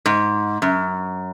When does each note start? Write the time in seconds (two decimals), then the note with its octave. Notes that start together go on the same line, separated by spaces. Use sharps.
0.06 G#2
0.62 F#2